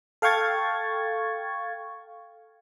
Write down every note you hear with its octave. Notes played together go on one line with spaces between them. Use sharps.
A4 F5 G5 C#6 G#6 A6